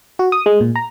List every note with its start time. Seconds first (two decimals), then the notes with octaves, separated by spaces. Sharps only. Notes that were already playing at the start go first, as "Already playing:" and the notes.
0.19 F#4
0.32 D#6
0.46 G#3
0.61 A#2
0.76 A#5